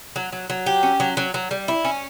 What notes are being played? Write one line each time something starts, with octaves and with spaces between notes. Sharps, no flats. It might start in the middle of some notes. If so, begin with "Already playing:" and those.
F#3
F#3
F#3
G4
C#4
F#3
F#3
F#3
G3
E4
C#4